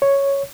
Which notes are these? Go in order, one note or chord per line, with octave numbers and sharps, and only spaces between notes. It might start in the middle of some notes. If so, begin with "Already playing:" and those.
C#5